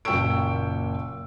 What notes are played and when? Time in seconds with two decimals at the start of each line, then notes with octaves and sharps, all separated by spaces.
0.05 F#1 A#2 G5 C#6 E6 D7